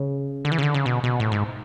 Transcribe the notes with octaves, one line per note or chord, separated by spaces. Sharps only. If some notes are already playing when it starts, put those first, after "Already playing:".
Already playing: C#3
D3
E3
C#3
D3
C#3
B2
B2
A2
G#2